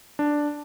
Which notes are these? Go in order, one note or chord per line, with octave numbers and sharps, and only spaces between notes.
D4